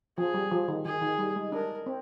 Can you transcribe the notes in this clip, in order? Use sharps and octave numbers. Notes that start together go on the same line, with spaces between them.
F3 G#4
G3
F3
D#3
D#3 G#4
D#3
G3
G#3
D4 A#4
C4